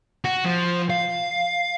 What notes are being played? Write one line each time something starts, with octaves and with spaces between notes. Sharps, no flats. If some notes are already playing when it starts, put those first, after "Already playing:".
F#4
F3
F5